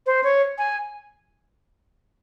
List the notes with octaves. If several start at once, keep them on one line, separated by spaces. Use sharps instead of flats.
C5
C#5
G#5